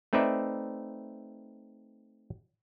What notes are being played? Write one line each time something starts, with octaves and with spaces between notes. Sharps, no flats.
A3 C4 D#4 B4 D5 E5